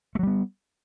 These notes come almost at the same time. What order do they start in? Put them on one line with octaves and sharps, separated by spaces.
A3 F#3 G3 B3